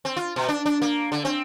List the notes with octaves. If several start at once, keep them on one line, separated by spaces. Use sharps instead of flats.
C4
F4
B2
D4
D4
A#3
D3
C4